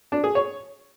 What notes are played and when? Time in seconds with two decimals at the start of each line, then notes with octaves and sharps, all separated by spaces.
0.12 D4
0.24 G#4
0.35 C#5